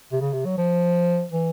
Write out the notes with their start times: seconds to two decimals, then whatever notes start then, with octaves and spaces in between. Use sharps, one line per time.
0.12 C3
0.21 C#3
0.33 C3
0.45 F#3
0.58 F3
1.32 E3